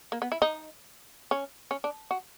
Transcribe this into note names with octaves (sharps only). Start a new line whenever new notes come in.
A#3
B3
E4
D#4
C#4
C#4
D4
F#4